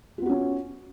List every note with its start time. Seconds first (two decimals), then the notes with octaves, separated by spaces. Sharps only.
0.18 F4
0.22 B3
0.26 F#4
0.29 C#4